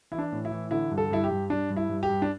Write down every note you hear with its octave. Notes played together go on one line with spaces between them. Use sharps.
E3 E4
D4
A2
E4
E3
D3 E4
G2
A4
G2 E4
G4
G2
G2 D4
G2
E4
G2
G4
G2
D4